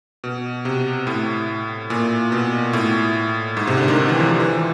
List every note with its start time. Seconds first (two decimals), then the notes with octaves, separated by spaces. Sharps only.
0.24 B2
0.65 C3
1.07 A2
1.90 A#2
2.32 B2
2.73 A2
3.57 G#2
3.67 C3
3.77 D3
3.88 D#3
3.98 D#3
4.09 E3
4.19 F3
4.29 F3
4.40 E3